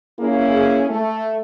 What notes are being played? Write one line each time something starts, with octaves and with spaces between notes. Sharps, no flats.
A#3 C#4 E4 G#4
A3